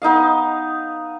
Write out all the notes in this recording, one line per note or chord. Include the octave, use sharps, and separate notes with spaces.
B3 D#4 D#5 F5